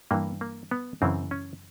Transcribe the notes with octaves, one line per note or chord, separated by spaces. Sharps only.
G2 E3 A#3
A#3
B3
F#2 C#3 E3 C4
C#4